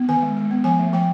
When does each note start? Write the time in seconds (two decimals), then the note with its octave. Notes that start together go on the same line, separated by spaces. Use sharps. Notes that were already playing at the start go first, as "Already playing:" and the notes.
Already playing: B3
0.09 D#3 G#5
0.22 G#3
0.37 G#3
0.51 B3
0.64 F3 G#5
0.79 A3
0.93 F3 G5